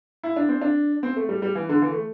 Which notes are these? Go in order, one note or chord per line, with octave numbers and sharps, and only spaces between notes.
E4
D4
C4
D4
C4
A3
G3
G3
E3
D3
E3
A3